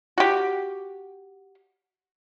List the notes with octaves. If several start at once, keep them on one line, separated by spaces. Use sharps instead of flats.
F#4 G4